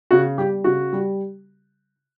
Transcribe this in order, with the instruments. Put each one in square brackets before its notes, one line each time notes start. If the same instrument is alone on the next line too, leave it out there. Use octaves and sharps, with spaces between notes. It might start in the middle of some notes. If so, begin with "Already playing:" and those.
[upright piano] C#3 F#4
G3 G4
C#3 F#4
G3